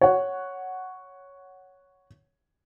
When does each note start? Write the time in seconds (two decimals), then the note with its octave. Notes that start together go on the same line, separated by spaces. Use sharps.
0.01 C#5 F#5